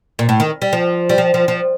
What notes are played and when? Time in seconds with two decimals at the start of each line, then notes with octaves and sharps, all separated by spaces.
0.19 A#2
0.29 A2
0.40 D#3
0.62 G3
0.73 F3
1.09 G3
1.18 F3
1.34 F3
1.48 F3